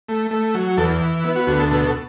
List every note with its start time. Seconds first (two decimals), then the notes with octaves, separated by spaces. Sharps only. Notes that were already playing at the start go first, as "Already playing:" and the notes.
0.09 A3
0.31 A3
0.55 F#3
0.77 E2 A4
1.01 E3
1.24 B3 E4
1.35 F#4
1.47 D2 F#4
1.60 A4
1.71 B2 A4
1.86 A4